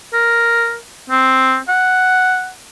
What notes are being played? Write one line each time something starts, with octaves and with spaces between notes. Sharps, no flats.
A#4
C4
F#5